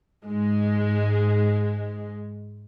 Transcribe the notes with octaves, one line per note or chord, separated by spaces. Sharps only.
G#2 G#3